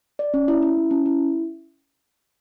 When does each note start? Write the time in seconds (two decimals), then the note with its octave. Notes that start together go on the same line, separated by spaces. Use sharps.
0.19 D5
0.34 C#4
0.48 E4
0.63 E4
0.77 C#4
0.91 C#4
1.06 E4